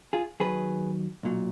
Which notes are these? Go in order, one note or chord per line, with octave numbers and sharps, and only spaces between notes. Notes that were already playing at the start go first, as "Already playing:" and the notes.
F4 G#4
D#2 D#3 F#3 G#4 B4
B1 A#2 F#3